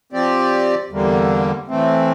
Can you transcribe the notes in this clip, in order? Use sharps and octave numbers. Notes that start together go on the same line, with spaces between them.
F3 C4 G4 D5
E2 D3 G3 A#3
A2 E3 A3 C4